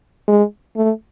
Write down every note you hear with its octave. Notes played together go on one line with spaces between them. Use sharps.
G#3
A3